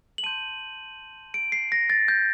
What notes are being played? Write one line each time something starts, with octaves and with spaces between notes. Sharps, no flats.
F#7
A5 C6 G6 D#7
D7
C7
A#6
A6
G6